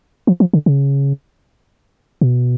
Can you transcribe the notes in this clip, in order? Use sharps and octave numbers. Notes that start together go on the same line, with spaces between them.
F3
F3
D3
C#3
B2